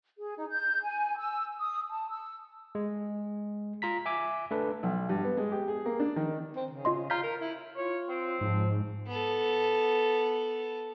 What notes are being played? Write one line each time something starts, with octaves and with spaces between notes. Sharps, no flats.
G#4
D#4
G6
G#5
E6
D#6
A5
E6
G#3
F4 A#5 B6
E5 G#5 D6
A3 D4 B4
B1
G2
B3
G#3
G4
G#4
A#3
D4
D#3
C4
C#3
F4 D#5 C6
F4 A#5 G6 B6
A#4
E4
F4 C#5
C4
G#2 F3
B3 A4